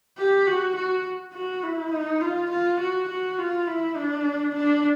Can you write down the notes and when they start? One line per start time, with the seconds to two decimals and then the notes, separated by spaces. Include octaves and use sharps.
0.18 G4
0.47 F#4
0.75 F#4
1.33 F#4
1.63 E4
1.91 D#4
2.21 F4
2.50 F4
2.79 F#4
3.08 F#4
3.38 F4
3.67 E4
3.96 D4
4.54 D4